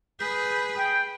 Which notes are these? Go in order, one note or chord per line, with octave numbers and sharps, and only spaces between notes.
G#4 B4 G6
G5